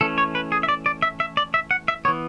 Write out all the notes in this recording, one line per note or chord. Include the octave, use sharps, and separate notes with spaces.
E3 A3 C#4 A4
C#5
B4
G#4
E5
D5
D5
E5
E5
D5
E5
F#5
E5
E3 B3 C#5